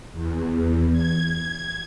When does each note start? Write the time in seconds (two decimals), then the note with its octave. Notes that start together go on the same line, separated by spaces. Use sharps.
0.13 E2
0.92 G#6